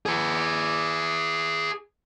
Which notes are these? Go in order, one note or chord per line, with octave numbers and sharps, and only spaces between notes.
G#4 B4